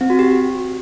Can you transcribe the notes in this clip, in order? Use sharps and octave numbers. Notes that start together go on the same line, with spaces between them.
C4
F#4
G4